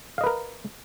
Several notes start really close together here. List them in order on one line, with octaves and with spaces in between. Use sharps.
F5 D#5 B4 A#4